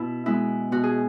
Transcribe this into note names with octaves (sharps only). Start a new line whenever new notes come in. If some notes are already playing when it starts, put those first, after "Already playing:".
Already playing: B2 E4
G#3 B3 E4
B2 F#4
G#4